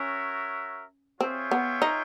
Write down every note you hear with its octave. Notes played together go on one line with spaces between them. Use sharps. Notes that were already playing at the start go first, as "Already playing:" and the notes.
Already playing: C#4 F#4 A#4 C#5 E5
C4 F4 G#4 C#5 E5 G5
B3
D#4